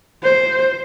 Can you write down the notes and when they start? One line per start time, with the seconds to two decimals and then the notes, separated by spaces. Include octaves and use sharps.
0.24 C5